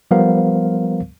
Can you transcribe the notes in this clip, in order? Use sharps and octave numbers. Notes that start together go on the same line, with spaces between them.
F3 G3 B3 A#4 C5 F5